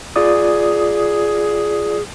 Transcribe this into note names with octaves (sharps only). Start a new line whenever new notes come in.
F4 G#4 D5 D#6